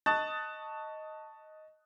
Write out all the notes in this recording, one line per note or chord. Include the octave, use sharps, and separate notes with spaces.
D#5 A5 C#6 D#6 F#6 A6